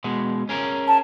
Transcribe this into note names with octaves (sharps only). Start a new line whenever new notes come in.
B2 G#3
C#4 G#4 A#4
A5